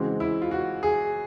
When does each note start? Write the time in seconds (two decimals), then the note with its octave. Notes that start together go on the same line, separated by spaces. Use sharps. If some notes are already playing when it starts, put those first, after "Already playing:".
Already playing: C#3 E3 G#3 C4 F#4
0.20 E4
0.42 F4
0.51 F#4
0.83 G#4